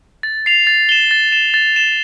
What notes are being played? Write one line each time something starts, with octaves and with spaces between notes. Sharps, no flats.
A6
C7 F7
A6
E7 G7
A6
E7 G7
A6
E7 G7